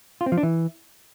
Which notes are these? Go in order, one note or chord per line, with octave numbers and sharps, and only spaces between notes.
F4
C4
F3
D4
E3